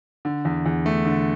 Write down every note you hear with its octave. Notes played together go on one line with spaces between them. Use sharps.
D3
E2
E2
A3
D3